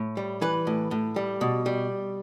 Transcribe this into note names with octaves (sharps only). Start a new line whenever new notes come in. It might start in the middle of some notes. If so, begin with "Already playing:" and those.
Already playing: A2
G3
E3 B4
A2
A2
G3
B2
G3